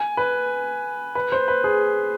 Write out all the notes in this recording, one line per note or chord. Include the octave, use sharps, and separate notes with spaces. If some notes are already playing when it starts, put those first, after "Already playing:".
Already playing: G#5
B4
B4
C5
B4
G#4